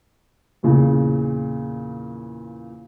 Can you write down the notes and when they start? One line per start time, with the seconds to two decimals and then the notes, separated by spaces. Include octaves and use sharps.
0.63 E2 A#2 C#3